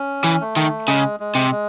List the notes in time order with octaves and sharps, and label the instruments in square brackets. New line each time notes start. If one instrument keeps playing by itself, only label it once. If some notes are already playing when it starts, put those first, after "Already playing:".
Already playing: [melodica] C#4
[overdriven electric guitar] E3
[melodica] A3
[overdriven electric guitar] D#3
[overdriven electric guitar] C#3 [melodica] G#3
[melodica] G#3
[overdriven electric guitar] C3
[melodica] G#3